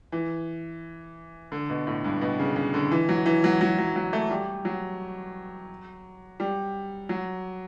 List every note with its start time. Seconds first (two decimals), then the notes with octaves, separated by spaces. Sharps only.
0.12 E3
1.52 D3
1.70 B2
1.87 A2
2.04 G2
2.21 B2
2.40 C#3
2.56 C#3
2.74 D3
2.91 E3
3.09 F#3
3.26 E3
3.44 F#3
3.61 F#3
3.78 F#3
3.96 F#3
4.13 A3
4.30 G3
4.65 F#3
6.40 G3
7.09 F#3